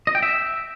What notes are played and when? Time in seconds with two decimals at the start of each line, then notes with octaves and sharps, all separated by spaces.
0.07 D#5
0.15 G5
0.23 E5